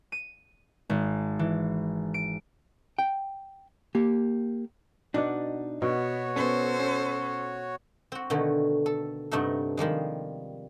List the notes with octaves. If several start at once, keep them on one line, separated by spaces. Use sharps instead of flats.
D#7
G#1
E3
D7
G5
A#3 G4
B2 D4 D#4 D5 F#5
B2 B3 F#4 C#5
B3 C#4 A4 C5
C#4
C4 F#4
B2 D3 D#3 A3
A4
G2 C3 A3 B3 D#4 A4
D#3 F3 G3 G#3